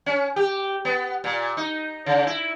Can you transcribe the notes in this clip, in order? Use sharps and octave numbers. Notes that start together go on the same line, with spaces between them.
C#4
G4
B3
A#2
D#4
C#3
E4